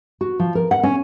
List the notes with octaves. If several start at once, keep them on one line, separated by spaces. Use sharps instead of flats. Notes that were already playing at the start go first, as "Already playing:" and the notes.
F#4
F3
A#4
F#5
C#4